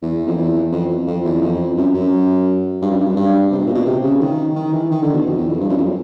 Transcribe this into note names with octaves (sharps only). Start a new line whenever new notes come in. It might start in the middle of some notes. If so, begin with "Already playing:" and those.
E2
F2
E2
F2
F2
E2
F2
F#2
F#2
G2
F#2
G2
F#2
G2
C3
B2
A#2
B2
C3
C#3
D#3
D#3
E3
D#3
D3
B2
F2
E2
F2
G2
F#2
F2